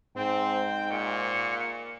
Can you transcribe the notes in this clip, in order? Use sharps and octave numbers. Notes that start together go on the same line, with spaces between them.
G#2 C4 G5
A#2 C#6